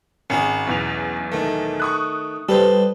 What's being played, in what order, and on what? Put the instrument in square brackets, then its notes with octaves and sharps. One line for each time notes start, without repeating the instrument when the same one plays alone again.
[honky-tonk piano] G#1 [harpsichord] C#4 F#4 G#4
[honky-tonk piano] B1 E2 F7
[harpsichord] D#3 A3
[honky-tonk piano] C#6 D#6 F#6
[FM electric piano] G3 [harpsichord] A4 B4 C5